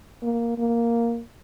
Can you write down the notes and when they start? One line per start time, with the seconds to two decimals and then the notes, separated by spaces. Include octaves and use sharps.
0.23 A#3
0.58 A#3